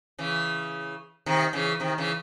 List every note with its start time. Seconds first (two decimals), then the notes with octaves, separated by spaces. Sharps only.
0.18 C#3 E3
1.26 C3 D#3
1.53 C#3 E3
1.80 C3 D#3
1.98 C#3 E3